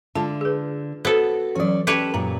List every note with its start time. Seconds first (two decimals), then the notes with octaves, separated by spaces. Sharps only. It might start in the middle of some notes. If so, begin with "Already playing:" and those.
0.15 D3 G#3 F4 A5
0.41 G#4 B4
1.05 B3 F#4 A4 C5
1.55 E3 F#3 C#4 D5
1.87 C#4 G4 A4 B4 C#5
2.14 F#2 A#2 A#5